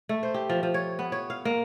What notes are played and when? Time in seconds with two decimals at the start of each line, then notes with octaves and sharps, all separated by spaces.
0.09 A3
0.23 C5
0.34 G4
0.50 F3
0.63 F3
0.74 C#5
0.99 B3
1.12 C#5
1.30 F5
1.45 A#3